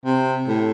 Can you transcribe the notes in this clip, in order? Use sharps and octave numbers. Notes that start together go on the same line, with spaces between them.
C3
A2